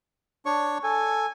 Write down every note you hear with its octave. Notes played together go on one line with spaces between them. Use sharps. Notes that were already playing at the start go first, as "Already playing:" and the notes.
D4 C#5 C#6
A4 G#5